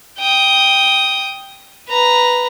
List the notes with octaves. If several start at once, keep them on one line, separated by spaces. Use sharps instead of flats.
G5 D#6
B4 A#5